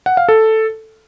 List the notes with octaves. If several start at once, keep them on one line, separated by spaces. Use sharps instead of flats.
F#5
F5
A4